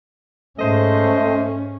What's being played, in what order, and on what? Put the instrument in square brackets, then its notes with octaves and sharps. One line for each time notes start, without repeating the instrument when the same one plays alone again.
[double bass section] G#2 [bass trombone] A3 [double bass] C#4 [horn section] C5 D#5